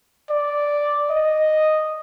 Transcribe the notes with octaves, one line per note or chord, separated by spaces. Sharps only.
D5
D#5